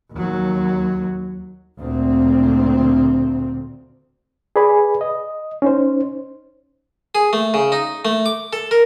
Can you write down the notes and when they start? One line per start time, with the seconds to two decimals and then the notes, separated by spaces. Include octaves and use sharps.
0.12 D#2 F#3
1.78 D2 A#2 C4
4.56 G#4 B4 D5 G#5 B5
5.01 D#5
5.62 C#4 D#4 C5
7.15 G#4
7.33 A3
7.54 C#3
7.72 D#4
8.05 A3
8.26 D6
8.53 A4
8.71 A#4